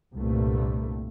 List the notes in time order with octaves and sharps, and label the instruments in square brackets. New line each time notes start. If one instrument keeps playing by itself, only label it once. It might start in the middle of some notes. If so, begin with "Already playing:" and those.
[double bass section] C2 G2 A#2 A3